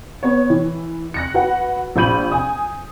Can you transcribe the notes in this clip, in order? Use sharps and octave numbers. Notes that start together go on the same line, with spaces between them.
B3 C#5
E3
F#6 A#6 C#7
F#4 B4 F#5
A#1 F4 B5 G6 D#7 F#7
G#5 D#6